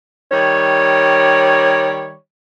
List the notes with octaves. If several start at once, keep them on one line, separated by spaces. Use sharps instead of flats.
D#3 G3 C#5